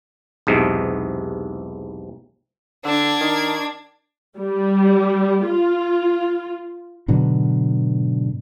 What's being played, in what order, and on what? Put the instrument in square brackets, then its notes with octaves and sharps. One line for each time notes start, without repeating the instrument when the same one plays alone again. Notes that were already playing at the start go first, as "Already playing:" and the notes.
[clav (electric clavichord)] B1 E2 G#2 C3
[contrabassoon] D3 [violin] D4 G#6
[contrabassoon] D#3
[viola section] G3
F4
[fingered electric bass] G#2 B2 D3 F#3